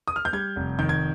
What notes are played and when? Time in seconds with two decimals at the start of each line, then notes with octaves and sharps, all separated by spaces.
0.08 D#6
0.16 F6
0.25 G6
0.33 G3 G#6
0.56 F1
0.79 D#3 G6
0.89 G#6